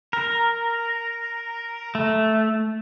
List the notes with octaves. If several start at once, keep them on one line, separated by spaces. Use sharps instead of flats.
A#4
A3